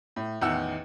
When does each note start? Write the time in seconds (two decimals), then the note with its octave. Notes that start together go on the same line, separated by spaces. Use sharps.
0.16 A2
0.41 A1 E2 D#3 F#5 E6